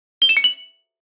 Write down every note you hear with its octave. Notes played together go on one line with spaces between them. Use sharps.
G7
E7
C#7
F#7